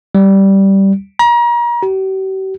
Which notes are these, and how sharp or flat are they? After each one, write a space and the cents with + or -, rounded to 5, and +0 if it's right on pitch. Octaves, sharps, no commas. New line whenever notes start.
G3 -10
A#5 +35
G4 -45